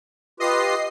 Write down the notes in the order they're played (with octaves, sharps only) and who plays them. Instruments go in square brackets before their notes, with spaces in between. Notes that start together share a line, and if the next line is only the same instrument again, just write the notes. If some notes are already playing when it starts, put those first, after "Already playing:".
[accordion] F4 G4 B4 [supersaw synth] D#5 C7